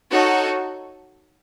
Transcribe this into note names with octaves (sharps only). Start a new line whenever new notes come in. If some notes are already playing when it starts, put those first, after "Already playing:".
D#4 F#4 A4 C#5